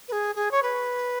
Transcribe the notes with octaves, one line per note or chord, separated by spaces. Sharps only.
B4
G#4
G#4
C#5
B4